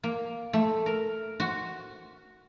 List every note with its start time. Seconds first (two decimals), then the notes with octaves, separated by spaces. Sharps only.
0.03 A#3
0.53 A3
0.86 A#4
1.40 F#4